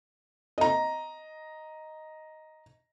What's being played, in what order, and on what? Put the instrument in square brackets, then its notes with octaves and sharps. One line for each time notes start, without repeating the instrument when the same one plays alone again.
[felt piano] D#5 A#5